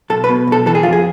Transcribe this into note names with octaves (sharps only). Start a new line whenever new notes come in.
B1 A4
B4
B2
B1 A4
E3 A4
G#4
F2 F4
G#4